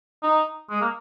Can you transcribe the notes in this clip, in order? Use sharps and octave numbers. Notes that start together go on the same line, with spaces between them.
D#4
G#3
A#3